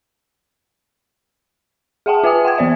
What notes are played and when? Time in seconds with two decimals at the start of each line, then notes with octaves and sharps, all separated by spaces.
2.06 G#4 E5 F#5 G5 A5
2.24 F4 B4 E5 G#5 D#6
2.45 F#5 G5 G#6
2.58 E3 B3 C5 D5 E5